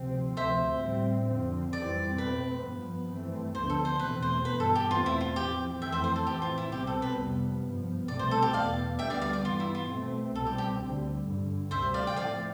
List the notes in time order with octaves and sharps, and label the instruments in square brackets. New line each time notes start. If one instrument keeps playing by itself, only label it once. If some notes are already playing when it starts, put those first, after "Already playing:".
Already playing: [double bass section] D2 C3 F3 C4
[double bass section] D2 C3 F3 C4 [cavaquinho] C5 E5
[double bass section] A2 G3 C4
F2 D3 F3 C4
[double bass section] F2 E3 G3 C4 [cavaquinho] D5
[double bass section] B2 A3 C4 [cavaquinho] B4
[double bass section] G2 F3 B3
G2 E3 A3 C4
[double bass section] D2 D3 F3 B3 [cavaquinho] C5
[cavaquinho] A4
C5
[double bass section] E2 B2 A3 C4 [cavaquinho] B4
[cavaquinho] C5
[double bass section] G2 E3 B3 [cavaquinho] B4
[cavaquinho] A4
G4
[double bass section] E2 B2 A3 C4 [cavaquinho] F4
[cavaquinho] E4
F4
[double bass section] A2 F3 C4 [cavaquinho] G4
[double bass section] F2 E3 A3 C4 [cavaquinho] E5 G5
[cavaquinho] C5 E5
C5
A4
[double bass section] A2 E3 A3 C4 [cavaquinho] G4
[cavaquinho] F4
E4
[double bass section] C2 B2 G3 C4 [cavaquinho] G4
[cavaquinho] A4
B4
[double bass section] F2 C3 G3 B3
G2 F3 B3
[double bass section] C2 B2 A3 C4 [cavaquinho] D5
[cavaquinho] C5
A4
G4
[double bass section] E2 B2 B3 [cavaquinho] D5 F5
[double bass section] D2 D3 G3 B3 [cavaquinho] E5 G5
[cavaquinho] D5 F5
D5 F5
D5
[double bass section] G2 E3 B3 [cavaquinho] F4
[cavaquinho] E4
F4
[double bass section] B2 A3 C4
[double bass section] C2 B2 G3 C4 [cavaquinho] A4
[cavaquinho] G4
G4
[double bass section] D2 D3 G3
G2 D3 G3
[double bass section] D2 C3 G3 C4 [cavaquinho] C5 E5
[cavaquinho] D5 F5
G5
[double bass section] A2 F3 A3 C4 [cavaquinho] D5 F5